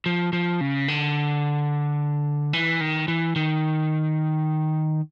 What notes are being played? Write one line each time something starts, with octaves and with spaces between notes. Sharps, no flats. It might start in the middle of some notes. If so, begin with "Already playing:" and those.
F3
F3
C#3
D3
E3
D#3
E3
D#3